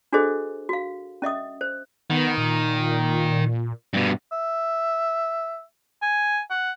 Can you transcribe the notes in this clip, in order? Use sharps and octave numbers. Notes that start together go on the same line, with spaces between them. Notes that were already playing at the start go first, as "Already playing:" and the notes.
D4 F#4 G#4 A4 C5 D#5
F#4 F5
C#4 D#5 E5 D#6
C5
D#3 B3
A#2
G2 B2
E5
G#5
F#5